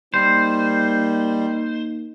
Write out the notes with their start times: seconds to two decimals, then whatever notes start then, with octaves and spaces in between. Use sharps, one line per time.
0.14 G3 A#3 D#4 C5